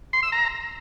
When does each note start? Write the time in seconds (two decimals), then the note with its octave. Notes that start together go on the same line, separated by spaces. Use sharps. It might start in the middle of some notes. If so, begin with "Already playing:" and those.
0.13 C6
0.23 E6
0.32 A#5